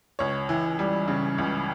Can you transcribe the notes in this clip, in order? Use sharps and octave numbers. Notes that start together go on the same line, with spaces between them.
C#2 C#5
E3
G3
C#3
C#2